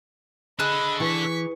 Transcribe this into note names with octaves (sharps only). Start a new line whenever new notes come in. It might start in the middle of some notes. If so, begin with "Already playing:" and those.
D4 G#4 A4 D#5 B5 F#6
E3 C#6 B6